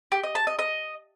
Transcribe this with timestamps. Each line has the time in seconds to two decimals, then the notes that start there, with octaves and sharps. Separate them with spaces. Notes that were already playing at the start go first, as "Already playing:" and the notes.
0.12 G4
0.23 D#5
0.35 A5
0.47 D#5
0.59 D#5